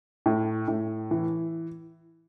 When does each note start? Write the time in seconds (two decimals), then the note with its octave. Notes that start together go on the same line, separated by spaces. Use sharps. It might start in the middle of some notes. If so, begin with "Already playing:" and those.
0.26 A2
0.68 A2
1.11 E3